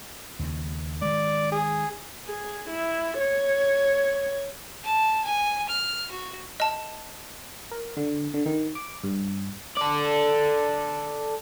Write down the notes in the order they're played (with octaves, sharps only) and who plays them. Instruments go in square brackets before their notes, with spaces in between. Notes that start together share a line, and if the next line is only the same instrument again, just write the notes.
[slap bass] D#2 C#3
[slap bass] D#3 G#3 [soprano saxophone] D5
[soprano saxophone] G#4
[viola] G#4
E4
C#5
[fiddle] A5
G#5
F6
F#4
[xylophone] D#5 A5
[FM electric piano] A#4
D3
D3
D#3
D6
G2
[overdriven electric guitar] A4 D5